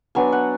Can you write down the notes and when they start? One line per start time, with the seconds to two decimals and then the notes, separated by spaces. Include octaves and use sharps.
0.15 F#3 B3 D4 G#5
0.32 F#5